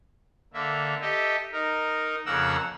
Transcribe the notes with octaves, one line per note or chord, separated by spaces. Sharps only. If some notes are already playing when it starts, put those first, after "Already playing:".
D3 A#3 E5
G4 A4 D#5 E5
D#4 A#4
F2 C#3 A#3 A#4 F#5 E6